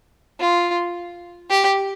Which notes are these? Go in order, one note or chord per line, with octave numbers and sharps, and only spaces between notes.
F4
G4